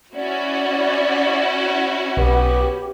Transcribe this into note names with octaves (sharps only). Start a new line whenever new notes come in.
C#4 E4 F#4 D5
B1 B3 G4